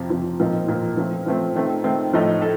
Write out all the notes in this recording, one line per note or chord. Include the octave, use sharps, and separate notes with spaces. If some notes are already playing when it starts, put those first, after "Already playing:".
Already playing: F2 C3 F3
F2 C3 F3
A#2 F3 C4 D#4 A#4
A#2 F3 C4 D#4 A#4
F3 A3 C4
F3 A3 C4
D#3 A3 C4
D#3 A3 C4
A2 F3 A3 D#4 A4
A4